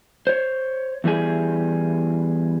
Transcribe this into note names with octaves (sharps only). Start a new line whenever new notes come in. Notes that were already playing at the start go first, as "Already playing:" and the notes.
C5 C#5
E2 E3 G3 G#4